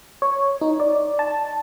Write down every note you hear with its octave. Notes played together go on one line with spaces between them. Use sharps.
C#5
D#4
D5
A5